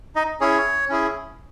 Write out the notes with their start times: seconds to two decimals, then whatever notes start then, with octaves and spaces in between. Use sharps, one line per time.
0.16 D#4 D#5
0.41 C#4 E4 G#4 C#5
0.89 C#4 E4 G#4